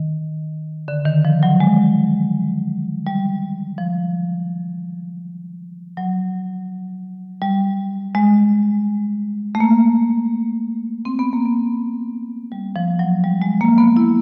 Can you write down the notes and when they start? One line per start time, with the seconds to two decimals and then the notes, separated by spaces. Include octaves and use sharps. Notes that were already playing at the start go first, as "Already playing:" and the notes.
Already playing: D#3
0.88 D3
1.06 D#3
1.25 F3
1.43 F#3
1.60 G#3
3.07 G3
3.78 F3
5.97 F#3
7.42 G3
8.15 G#3
9.55 A3
9.60 A#3
11.05 C4
11.19 B3
11.33 A#3
11.45 B3
12.52 G3
12.76 F3
12.99 F#3
13.24 G3
13.42 G#3
13.61 A#3
13.78 B3
13.97 E4